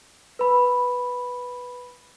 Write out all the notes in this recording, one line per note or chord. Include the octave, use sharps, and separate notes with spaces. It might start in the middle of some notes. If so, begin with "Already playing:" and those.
B4 B5